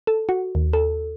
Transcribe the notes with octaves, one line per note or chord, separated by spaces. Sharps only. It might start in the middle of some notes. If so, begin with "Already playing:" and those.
A4
F#4
D#2
A4